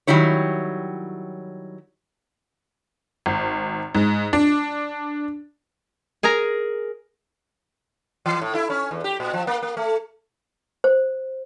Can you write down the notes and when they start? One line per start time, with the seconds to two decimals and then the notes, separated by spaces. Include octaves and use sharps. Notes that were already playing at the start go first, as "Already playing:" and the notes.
0.07 D#3 F#3 G3 E4 C#5
3.26 G#1
3.95 G#2
4.33 D4
6.23 G#4 A#4 G#5 A#5
8.26 E3
8.42 A2
8.55 E4
8.70 C#4
8.91 E2
9.04 G4
9.20 A#2
9.33 F3
9.47 A#3
9.62 A#3
9.77 A3
10.84 C5